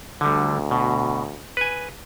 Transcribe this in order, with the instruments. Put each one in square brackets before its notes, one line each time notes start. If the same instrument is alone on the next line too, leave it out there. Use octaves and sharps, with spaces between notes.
[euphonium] D2 [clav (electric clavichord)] D3 G3
[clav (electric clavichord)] B2
B4 G#5